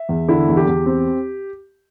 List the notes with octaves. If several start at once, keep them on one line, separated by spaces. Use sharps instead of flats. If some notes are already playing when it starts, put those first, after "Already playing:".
Already playing: E5
E2
D3 E4
E2
G4
E2
C4